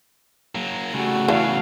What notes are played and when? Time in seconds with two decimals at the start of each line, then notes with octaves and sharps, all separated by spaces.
0.55 F#3 A#3
0.93 C#3 G3 A3 F#4
1.28 E2 C#3 E3 D4 F5